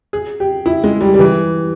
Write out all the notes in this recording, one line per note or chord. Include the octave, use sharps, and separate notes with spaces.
G#4
G4
E4
G#3
G3
G3
E3